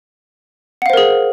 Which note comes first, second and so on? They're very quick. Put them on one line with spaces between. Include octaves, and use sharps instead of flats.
F#5 F5 C5 A#4 G#4